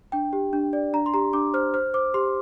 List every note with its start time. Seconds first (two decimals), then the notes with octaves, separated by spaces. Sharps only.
0.12 D4 G5
0.33 G4
0.53 D4
0.73 D5
0.93 D4 A#5
1.06 C6
1.14 G4 A#5
1.33 D4 D6
1.54 C5 F6
1.74 C5 F6
1.94 C5 D6
2.14 G4 C6